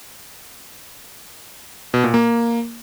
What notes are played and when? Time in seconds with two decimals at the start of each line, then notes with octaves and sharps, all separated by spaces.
1.94 B2
2.04 A#2
2.14 A#3